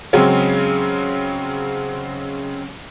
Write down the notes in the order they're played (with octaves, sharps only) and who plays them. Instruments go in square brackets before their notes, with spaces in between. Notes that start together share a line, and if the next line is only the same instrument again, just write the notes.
[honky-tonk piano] C#3 F#3 G#3 C4 C#4